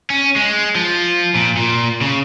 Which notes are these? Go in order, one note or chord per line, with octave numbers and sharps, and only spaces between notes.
C#4
G#3
F3
A#2
A#2
C#3